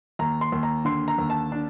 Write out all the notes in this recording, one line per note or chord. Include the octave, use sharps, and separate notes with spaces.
D#2 A#5
C6
D#2
A#5
D3 C6
A#5
D#2
A5
D4